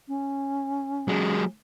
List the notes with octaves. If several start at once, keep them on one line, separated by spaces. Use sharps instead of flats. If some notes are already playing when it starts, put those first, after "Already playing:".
C#4
F#3 G#3